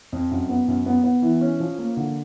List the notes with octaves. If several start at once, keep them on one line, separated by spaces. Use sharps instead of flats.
F2
F#2
B3
F#2
B3
B3
E3
C#4
F3
A#3
D3